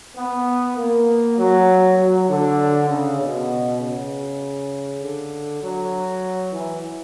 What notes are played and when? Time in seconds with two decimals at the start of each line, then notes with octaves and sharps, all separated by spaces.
0.15 B3
0.76 A#3
1.38 F#3
1.98 F#3
2.29 D3
2.88 C#3
3.19 B2
3.80 C#3
5.01 D3
5.62 F#3
6.52 E3